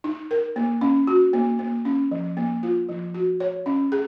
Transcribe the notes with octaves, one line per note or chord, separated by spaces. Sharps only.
D#4
A#4
A#3
C#4
F#4
A#3
A#3
C#4
F3
A#3
F4
F3
F#4
C#5
C#4
G#4